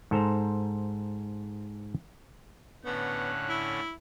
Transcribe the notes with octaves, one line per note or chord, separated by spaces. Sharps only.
G#2 A4 C5 A#5
A2 D3 B3 C#4 F#6
E4